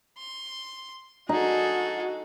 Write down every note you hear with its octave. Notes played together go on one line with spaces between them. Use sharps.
C6
D#4 F#4 G#4 A4